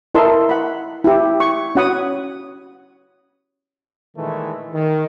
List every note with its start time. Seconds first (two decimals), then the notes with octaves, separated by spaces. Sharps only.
0.14 E4 A4 A#4 D#5 A5 C6
0.49 F#5 B5
1.04 E4 G4
1.40 C#6
1.75 C#4 F#4 F#5 B5 D#6
4.17 A#2 D#3 E3 G#3 A3
4.73 D#3